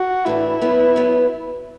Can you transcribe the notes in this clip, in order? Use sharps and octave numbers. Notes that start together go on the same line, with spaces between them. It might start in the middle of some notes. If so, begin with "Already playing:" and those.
Already playing: F#4
A2 E3 D4 E4
B2 F#3 B3
B2 F#3 B3